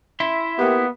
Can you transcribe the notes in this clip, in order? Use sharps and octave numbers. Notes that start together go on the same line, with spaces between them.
E4 E5 C6
A#3 B3 G4